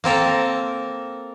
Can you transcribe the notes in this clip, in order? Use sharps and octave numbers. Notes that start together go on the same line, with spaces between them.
A#3 C4 A4 A#4